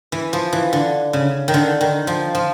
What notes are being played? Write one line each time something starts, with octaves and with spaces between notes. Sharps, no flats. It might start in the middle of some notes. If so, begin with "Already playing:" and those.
E3
F3
E3
D3
C#3
D#3
D3
D#3
F3
F3